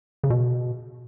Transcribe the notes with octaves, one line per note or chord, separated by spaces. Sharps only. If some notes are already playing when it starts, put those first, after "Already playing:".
C#3
B2